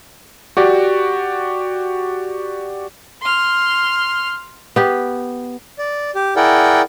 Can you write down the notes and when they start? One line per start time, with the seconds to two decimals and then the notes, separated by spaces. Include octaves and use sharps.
0.57 F#4 G4 D5
3.22 C6 F6
4.76 B3 G4
5.78 D5
6.15 G4
6.36 E4 G#4 A#4 D5 F#5 G5